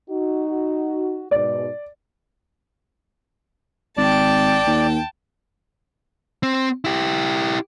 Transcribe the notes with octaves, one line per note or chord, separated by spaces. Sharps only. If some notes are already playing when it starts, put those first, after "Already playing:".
D#4 F#4
G#2 B2 D5
G#1 D5 G5 A5
D#2
C4
E4 G4